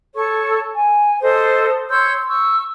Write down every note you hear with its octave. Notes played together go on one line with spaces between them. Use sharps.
A4 C#5 C#6
G#5
A4 C5 D#5 D#6
C#5 C6 E6 G6
C#6 E6